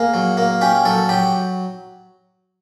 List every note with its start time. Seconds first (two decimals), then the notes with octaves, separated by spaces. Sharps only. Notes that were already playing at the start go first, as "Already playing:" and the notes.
Already playing: A#3 G#4
0.14 F#3
0.37 A#3
0.61 C#4 G4
0.85 F#3 A4
1.09 F#3 G4